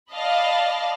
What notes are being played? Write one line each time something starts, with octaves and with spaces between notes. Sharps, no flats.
D5 D#5 F5 A5 B5